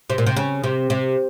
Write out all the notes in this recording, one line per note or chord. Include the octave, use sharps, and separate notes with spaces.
C3
A#2
C3
C#3
C3
C3